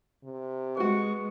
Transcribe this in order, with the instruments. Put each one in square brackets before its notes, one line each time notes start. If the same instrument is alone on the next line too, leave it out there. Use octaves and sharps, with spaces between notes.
[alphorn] C3
[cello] G#3 [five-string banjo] B3 F#4 [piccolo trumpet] C#6